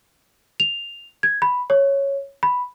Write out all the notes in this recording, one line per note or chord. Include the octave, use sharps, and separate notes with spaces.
F7
G#6
B5
C#5
B5